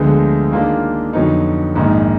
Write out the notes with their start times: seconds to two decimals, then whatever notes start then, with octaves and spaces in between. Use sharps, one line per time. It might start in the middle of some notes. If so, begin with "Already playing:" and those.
Already playing: D2 D3 F3 G#3 B3
0.51 D#3 A#3 D4 F4 G#4
1.13 F2 D3 F#3 B3 D#4
1.76 A#1 G#2 D#3